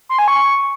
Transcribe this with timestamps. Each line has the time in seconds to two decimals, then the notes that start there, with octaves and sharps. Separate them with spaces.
0.09 C6
0.19 G#5
0.28 C#6